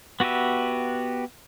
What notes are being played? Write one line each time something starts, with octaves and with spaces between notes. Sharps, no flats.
B3 F#4 G4 B4 E5